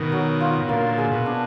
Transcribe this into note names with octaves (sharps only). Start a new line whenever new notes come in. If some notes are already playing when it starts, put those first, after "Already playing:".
Already playing: B2 D#3 A#4
F#3
F4
B2
A#2 D3 A#3
G#4
B2
D4